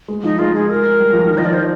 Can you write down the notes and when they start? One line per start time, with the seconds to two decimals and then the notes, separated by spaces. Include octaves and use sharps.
0.08 G#3
0.24 F3 D#4
0.39 G#3 F4
0.55 G#4
0.70 A#4
1.00 G3
1.13 F3
1.26 D#3
1.38 F3 D#5
1.45 D5
1.54 C5